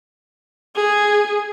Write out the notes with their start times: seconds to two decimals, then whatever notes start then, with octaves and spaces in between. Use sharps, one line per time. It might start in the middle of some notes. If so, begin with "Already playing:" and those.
0.76 G#4